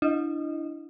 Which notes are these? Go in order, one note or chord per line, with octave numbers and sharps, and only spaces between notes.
D4 E4 D#5